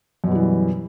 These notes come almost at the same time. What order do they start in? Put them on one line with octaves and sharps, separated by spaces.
F#2 B2 G3 E3